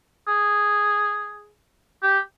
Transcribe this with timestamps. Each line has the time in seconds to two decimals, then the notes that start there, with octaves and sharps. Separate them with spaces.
0.27 G#4
2.02 G4